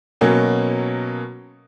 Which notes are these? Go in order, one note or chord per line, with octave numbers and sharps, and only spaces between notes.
B2 F#3 A#3 C#4